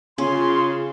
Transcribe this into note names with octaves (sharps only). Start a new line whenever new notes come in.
C#3 C#4 F4 C6